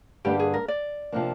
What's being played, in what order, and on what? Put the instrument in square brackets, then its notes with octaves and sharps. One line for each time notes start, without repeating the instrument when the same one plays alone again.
[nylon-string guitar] G2 D3 G3 A#3 D4 [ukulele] G4
[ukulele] G#4
A#4
D5
[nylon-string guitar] C3 F3 A#3 D4